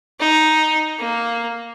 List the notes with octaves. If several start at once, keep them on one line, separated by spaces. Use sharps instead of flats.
D#4
A#3